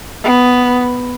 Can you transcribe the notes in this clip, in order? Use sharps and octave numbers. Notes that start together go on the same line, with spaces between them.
B3